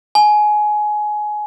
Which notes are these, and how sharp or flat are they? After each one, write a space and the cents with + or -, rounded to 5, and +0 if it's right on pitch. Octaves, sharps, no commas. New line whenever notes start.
G#5 +20